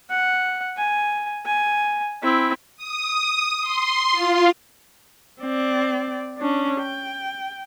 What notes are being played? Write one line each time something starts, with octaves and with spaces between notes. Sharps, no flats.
F#5
G#5
G#5
C4 E4
D#6
D#6
C6
F4
C4 D5
C#4 D4
G5